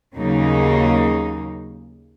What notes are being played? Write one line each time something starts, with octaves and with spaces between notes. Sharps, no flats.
D#2 C#3 F#3 A#3 D#4